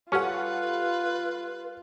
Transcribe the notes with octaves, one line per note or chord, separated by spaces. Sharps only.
G3 C#4 F4 A4 B4 F#5